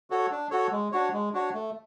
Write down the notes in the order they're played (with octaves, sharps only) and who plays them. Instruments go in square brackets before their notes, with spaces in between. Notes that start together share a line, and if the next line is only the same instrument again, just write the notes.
[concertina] F#4 A4 C#5
D4
F#4 A4 C#5
G#3
D4 F#4 C#5
G#3
D4 F#4 C#5
A3